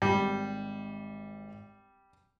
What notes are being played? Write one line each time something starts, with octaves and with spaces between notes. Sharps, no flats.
G#1 G3